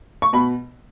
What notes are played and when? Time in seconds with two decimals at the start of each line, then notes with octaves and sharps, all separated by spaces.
0.22 C#6
0.33 B2 B5